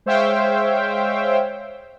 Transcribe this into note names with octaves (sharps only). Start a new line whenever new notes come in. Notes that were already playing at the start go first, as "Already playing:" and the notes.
G#3 C5 C#5 E5 F5 G5